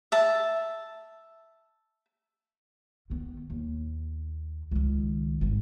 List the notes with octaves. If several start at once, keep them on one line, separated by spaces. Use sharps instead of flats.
E5 A5
D#3 B3
D#2
C#2 D#3
G#1 G2